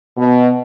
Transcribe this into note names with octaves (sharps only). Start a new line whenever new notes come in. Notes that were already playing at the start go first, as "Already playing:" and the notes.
B2